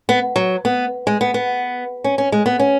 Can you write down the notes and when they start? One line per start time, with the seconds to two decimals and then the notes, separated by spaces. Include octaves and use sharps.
0.09 B3
0.36 F#3
0.65 B3
1.07 G#3
1.21 B3
1.34 B3
2.04 C#4
2.18 C#4
2.32 G#3
2.46 B3
2.60 C#4